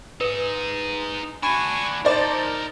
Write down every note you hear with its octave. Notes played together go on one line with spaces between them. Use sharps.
D#4 G#4 B4
D4 F#4 G#5 B5 C#6
D#4 A#4 C5 D5 A5